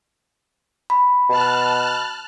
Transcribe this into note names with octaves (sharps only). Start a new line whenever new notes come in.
B5
B2 A5 F6 F#6